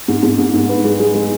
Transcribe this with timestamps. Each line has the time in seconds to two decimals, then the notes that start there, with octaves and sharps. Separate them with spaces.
0.08 G#2
0.22 G#2
0.38 G#2
0.53 G#2
0.69 B4
0.84 G#3
0.99 G#3
1.15 G#3